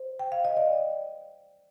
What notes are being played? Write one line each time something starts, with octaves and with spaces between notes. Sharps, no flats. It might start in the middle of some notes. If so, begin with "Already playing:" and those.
Already playing: C5
G5
F5
D#5
D5